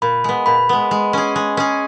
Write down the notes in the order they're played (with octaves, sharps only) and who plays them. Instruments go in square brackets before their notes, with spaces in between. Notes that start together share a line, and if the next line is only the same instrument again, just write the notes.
[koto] A#2 [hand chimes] B5
[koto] G#3 B3
[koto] A#2 [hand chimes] B5
[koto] G#3 B3
G#3
C#4 G#4
G#3
C#4 G#4